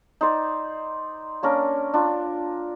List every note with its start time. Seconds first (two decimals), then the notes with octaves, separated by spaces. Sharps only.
0.21 D#4 C5 D5
1.43 A#3 C#4 D4 A#4
1.94 D4 F4